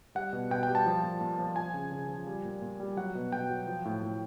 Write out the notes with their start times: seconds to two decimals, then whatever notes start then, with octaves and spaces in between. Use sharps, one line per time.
0.15 G3 F#5
0.33 B2
0.51 B2 G5
0.63 G3 G5
0.75 A5
0.86 F3
1.03 A#2
1.21 A#2
1.39 F3
1.56 F3 G#5
1.74 C#3
1.92 C#3
2.09 F3
2.27 G3
2.45 A#2
2.62 A#2
2.80 G3
2.97 F#3 F#5
3.15 B2
3.32 B2 G5
3.50 F#3
3.67 F3
3.85 A2
4.03 A2